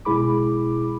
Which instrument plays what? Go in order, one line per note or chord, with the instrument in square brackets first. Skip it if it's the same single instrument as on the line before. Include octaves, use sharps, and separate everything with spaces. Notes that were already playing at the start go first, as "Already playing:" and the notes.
[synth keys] B2 G#3 E4 G#4 B5 D6